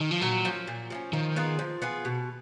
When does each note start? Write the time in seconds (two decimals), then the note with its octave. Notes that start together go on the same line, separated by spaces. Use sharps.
0.01 D#3
0.11 F3
0.21 A#2 F#3
0.45 F3 A#3 C#4
0.67 A#2
0.90 F3 A#3 C#4
1.13 D#3 F3
1.36 B3 F4 G#4
1.59 F3
1.82 B3 F4 G#4
2.05 B2